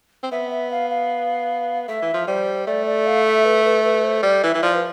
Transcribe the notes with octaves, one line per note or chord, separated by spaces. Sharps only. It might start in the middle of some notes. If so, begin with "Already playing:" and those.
C4
B3 E5
E5
F5
F5
A3 E5
E3
F3
G3 C5
A3 D5
D5
F5
E5
B4
B4
B4
C5
G3 D5
E3 E5
E3
F3 D5
B4